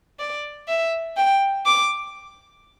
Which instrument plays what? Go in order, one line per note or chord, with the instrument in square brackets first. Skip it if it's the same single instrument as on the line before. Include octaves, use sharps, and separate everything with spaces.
[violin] D5
E5
G5
D6